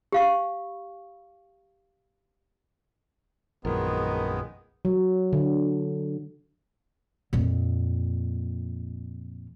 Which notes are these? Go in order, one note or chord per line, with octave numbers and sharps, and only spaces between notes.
G4 F5 C#6
A#1 F#2 D#3 G#3 B3 A#4
F#3
D3
F2 A#2